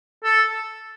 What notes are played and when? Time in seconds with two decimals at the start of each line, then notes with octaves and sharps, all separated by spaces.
0.24 A4